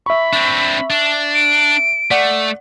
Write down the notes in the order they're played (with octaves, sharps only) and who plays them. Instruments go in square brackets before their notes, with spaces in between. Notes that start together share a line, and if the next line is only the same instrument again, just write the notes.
[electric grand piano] E5 C#6 [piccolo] B5
[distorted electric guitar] C4 D4
D4
[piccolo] D7
[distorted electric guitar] A3 [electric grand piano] D5 F#5